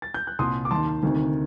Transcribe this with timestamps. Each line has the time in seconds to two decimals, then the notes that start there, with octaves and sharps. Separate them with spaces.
0.02 A6
0.14 G6
0.27 F#6
0.39 C2 A#2 C6 D#6
0.65 D6
0.71 D#2 D#3 A5 C6
1.03 D2 C3 D#3